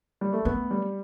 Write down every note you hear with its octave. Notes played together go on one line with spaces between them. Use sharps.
G3
A3
A3 B3
G3